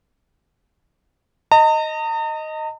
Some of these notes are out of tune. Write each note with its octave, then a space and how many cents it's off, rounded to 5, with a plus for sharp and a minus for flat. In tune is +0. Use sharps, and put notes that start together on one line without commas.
D#5 +0 A#5 -45